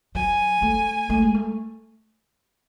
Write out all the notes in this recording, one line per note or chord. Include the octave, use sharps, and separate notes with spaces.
F#3 G#5
A3
A3
G#3
A3